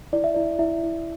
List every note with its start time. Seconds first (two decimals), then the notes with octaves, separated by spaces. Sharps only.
0.13 E4 D5
0.24 E5
0.34 E4 D5
0.59 E4 E5
0.83 E4